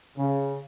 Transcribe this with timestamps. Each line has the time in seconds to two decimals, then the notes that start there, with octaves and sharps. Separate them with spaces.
0.18 C#3